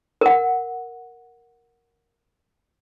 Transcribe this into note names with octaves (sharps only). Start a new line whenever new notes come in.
A#4 F#5